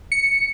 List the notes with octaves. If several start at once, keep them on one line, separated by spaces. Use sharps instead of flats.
C#7